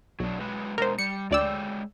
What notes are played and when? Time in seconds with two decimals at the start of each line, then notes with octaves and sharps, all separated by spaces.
0.20 B1 F#3 D4
0.40 F#3 G#3 B4
0.78 B2 G#3 A#4 C5
0.99 G3 C#7
1.31 D2 G#3 C#5 D5 G5 E6